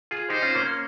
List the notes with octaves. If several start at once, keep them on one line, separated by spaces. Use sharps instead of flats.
F4 G#4
D#4 G4 C5
C#4 F4
A#3 C#4